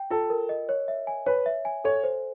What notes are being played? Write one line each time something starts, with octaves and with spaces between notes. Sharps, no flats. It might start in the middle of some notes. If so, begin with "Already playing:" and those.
Already playing: G5
F4 A4
A#4
D#5
C#5
E5
G#5
B4 C#5
E5
G#5
A4 C#5
C5